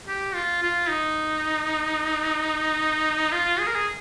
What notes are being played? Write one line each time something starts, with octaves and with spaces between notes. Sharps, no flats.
G4
F4
F4
D#4
F4
G#4
A#4
G#4